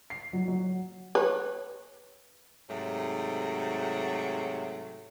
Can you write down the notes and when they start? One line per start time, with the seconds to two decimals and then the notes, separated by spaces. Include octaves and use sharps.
0.10 C7
0.33 F#3
0.48 F#3
1.15 B4 C#5
2.70 G#2 C3 F#3 A3